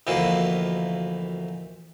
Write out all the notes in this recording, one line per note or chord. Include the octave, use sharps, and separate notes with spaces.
D2 B2 E3 F3 A#3